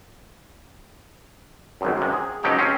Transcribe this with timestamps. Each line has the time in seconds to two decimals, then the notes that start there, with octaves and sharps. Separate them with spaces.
1.81 G#1 C#2 F#2
1.98 F#2 C3
2.13 G#4
2.43 C#2 F3 F#3 D#4 G4 G5
2.58 C4 C#4